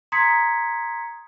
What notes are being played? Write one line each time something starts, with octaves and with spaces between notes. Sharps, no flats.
A#5 C6 D#6 G#6 B6 C#7